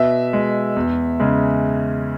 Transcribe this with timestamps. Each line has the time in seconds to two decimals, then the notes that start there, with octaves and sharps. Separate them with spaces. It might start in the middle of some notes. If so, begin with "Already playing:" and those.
Already playing: B2 E5
0.33 G#3
0.76 E2
1.20 C#3 G#3